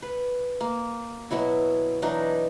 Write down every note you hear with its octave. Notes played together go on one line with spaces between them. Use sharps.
B4
A#3
B2 F#3 E4 F#4
E3 F#3 D4 D#4